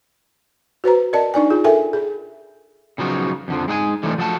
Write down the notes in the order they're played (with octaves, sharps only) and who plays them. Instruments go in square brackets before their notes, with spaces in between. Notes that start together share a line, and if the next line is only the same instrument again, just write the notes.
[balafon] F#4 B4 C5 A#5
A#4 D5 D#5 A5
D4 D#4 D5 G#5
F4 G#4
A4 A#4 E5 G5 G#5
G#4
[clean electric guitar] C#3 F3 F#3 B3 D#4
F2 D3 F3
G#3 D#4 F#5 G#5
D3 E3 F3 G3 A3 D#4
F3 F#3 A3 F#4 G#5 A5